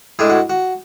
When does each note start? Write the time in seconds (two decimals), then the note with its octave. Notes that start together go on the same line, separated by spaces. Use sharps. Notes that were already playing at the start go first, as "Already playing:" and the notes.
0.19 A2 G#3 D4 G#4
0.30 F#4
0.50 F#4